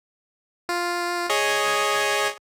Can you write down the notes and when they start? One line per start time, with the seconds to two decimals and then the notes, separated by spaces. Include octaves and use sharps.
0.69 F4
1.30 G#4 C#5 D#5